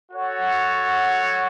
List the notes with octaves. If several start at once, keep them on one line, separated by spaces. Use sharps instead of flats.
F#4 A4 C#5 F#5